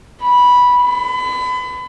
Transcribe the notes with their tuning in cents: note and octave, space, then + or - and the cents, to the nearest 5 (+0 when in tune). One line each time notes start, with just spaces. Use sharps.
B5 -10
B5 +30